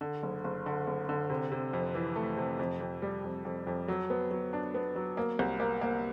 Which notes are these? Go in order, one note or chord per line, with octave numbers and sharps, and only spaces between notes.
D3
F#1
F#1
D3
F#1
D3
C3
C3
F2
E3
A3
C3
F2
F2
G3
F2
F2
F2
F#3
B3
F#3
D4
B3
F#3
A#3
C2
A#3
A#3